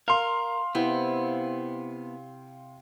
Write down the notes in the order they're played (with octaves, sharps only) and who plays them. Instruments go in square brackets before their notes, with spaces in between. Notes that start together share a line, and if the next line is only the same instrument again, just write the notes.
[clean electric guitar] A#4 [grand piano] F5 C6
[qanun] C3 E4 G5 [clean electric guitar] B3